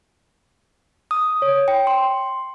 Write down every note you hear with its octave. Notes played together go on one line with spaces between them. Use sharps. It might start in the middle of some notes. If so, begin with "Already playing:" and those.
D#6
C#5
G5
C6